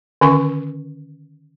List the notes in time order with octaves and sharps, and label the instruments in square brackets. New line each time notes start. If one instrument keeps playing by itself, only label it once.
[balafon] D3 D#3 C#4 A#4 G#5 C#6